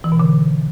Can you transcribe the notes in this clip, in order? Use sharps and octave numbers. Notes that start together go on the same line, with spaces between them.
E3
B2
D3